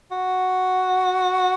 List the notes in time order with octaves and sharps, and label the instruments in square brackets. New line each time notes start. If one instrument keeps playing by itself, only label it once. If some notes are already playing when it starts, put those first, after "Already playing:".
[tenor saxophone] F#4